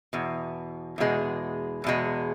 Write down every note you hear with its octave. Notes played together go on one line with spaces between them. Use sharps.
E2 B2
E2 B2 G#3
E2 B2 G#3